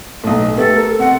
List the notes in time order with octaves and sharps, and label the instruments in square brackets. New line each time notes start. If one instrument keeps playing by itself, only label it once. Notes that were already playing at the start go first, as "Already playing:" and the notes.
[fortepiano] B1 A2
[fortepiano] A3 B3 G4 [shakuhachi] A4
[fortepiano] A#4
[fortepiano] C3 [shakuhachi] F#5